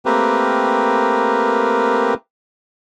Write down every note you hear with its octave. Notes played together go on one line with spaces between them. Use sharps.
A3 A#3 C4 G4 A#4 B4